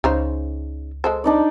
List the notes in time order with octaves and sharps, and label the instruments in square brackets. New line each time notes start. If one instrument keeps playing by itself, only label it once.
[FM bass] C#2 [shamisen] C#3 D#4 C5
[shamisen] G#3 A4 C5
[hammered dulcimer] D4 D#4 D5